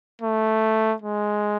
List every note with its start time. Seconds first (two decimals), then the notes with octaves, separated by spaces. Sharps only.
0.22 A3
1.02 G#3